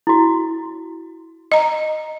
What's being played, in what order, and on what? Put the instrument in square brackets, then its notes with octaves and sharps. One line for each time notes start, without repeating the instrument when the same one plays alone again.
[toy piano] E4 F#4
[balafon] D#5 A#5